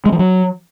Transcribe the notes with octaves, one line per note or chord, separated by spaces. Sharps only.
G#3
F3
F#3